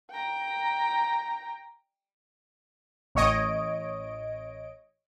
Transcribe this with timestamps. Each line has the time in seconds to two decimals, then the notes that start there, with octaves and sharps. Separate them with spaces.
0.11 G5 A#5
3.15 A1 C#5 D#5 D7